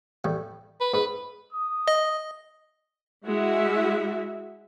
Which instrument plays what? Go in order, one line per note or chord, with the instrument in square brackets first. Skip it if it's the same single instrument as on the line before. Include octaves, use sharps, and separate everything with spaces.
[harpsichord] A2 E3 G3
[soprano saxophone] B4
[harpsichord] G#2 [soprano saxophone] B4
[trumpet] D#6
[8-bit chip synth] D#5
[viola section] G#3 E4 F#4 E5